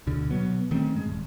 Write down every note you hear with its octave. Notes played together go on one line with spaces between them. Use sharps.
D2 B2 D3
B2 F#3 B3
D#3 A3 C4 C#4
G#2 G#3
D#1